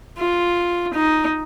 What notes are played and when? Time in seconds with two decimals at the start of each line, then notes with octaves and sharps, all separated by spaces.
0.18 F4
0.93 D#4